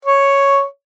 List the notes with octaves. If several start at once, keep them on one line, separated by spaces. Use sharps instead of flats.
C#5